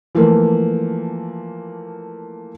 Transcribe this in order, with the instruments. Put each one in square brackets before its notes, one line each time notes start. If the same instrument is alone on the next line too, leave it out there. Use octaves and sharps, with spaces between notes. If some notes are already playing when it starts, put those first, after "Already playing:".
[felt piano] E3 F3 A3 A#3